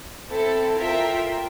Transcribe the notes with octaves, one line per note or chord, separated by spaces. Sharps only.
C4 E4 A4
F4 A#4 E5 G5